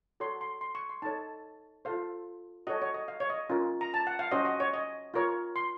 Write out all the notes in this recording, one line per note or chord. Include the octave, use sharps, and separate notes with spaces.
F#4 A4 C#5 C6
C6
C6
C#6
C6
D#4 A4 C#5 A5
F4 A4 C5 F5
F#4 A4 C#5 D#5
C#5
D#5
F5
C#5
D#5
C#4 F4 A#4
A#5
A5
F#5
F5
C#4 F#4 C5 D#5
D#5
C#5
D#5
F4 A#4 C#5
C6